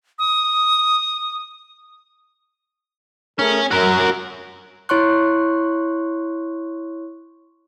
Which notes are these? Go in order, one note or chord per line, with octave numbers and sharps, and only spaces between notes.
D#6
A3 C#4 G#4 A#4
F#2 F#4 A#4
E4 C#5 C6 C#6 F#6